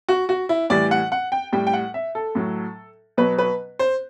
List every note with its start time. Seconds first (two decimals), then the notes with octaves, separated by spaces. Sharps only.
0.09 F#4
0.29 F#4
0.49 E4
0.70 A2 E3 G3 D5
0.91 F#5
1.12 F#5
1.32 G5
1.53 A2 G3 G5
1.67 G5
1.73 F#5
1.94 E5
2.15 A4
2.35 A2 F#3
3.17 B2 F#3 B4
3.38 B4
3.79 C5